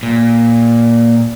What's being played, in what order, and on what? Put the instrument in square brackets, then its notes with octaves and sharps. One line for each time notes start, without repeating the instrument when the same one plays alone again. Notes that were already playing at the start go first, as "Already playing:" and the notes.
[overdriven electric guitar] A#2